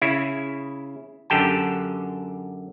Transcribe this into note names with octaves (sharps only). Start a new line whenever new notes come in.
C#3 E4
F#2 D3 G4 G5 A5